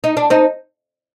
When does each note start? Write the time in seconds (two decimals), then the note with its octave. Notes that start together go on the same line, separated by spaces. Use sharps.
0.04 D#4
0.17 D4
0.30 C4 D#4